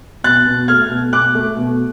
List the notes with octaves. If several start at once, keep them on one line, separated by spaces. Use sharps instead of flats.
B2 F#6 A6
B2
A3 F6 G#6
B2
B2 D6 F#6
A3
B2